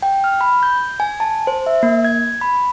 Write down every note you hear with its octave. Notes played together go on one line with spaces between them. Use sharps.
G5
F6
B5
G6
G#5
A5
C5
E5
A#3
G#6
B5